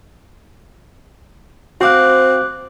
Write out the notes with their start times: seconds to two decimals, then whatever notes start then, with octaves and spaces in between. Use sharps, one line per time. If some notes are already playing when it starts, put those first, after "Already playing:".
1.81 C4 F#4 C5 F5 D6 F#6